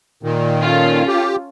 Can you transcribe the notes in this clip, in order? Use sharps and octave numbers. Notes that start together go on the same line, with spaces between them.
A#2 D#3
C#4 F4 A4
G4